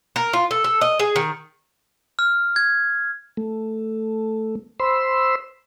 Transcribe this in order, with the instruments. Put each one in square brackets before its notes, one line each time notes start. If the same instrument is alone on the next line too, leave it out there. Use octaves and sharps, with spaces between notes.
[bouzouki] A#4
F4
A4
A4
D#5
G#4
D#3
[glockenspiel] F6
G#6
[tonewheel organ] A3
C5 B5 C6 E6